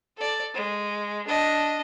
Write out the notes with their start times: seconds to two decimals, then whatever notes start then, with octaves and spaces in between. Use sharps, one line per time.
0.17 A4 D5
0.54 G#3
1.27 D4 D#5